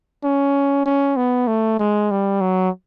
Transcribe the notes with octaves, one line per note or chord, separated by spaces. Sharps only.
C#4
C#4
B3
A3
G#3
G3
F#3